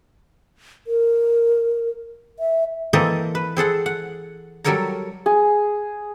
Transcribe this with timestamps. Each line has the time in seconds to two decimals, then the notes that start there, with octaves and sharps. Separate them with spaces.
0.87 A#4
2.39 E5
2.93 E3 A#3 C4 A4 D#5
3.35 B4
3.57 C4 G#4 A4 F#5
3.86 F#5
4.64 F#3 G3 A4 A#4 C#5 A#5
5.26 G#4